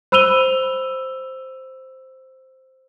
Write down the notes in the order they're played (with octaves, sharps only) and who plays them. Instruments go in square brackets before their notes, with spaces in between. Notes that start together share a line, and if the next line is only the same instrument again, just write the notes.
[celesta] C5 B5 E6 D#7 F7 G7